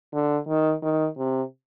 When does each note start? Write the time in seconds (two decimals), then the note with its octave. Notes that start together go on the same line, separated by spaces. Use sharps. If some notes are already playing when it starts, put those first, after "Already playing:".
0.13 D3
0.48 D#3
0.82 D#3
1.17 C3